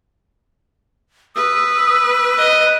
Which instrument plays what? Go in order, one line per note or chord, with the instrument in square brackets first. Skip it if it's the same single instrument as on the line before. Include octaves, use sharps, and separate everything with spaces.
[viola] B4 [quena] D#6 [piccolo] E6
[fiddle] D#5 [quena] F#6